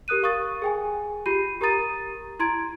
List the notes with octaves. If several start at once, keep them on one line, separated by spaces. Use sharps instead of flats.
G4 A#4 D#6 F#6 D#7
A#4 F5 C#6 D#6 A6
G#4 G5 G#5
F4 G4 B5 G6 C7 D#7
G4 A#4 A#5 D#6 A6 D#7
E4 A#5 C6 G#6 D7